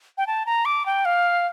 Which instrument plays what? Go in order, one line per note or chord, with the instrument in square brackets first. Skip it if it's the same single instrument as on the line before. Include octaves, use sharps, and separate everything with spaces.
[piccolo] G5
A5
A#5
D6
G5
F5